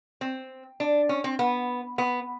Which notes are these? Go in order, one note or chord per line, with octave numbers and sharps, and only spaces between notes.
C4
D4
C#4
C4
B3
B3